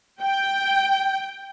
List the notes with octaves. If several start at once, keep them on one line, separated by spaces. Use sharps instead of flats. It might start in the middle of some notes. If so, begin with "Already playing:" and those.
G5